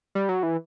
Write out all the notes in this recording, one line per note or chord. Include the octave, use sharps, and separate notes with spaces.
G3
F#3
E3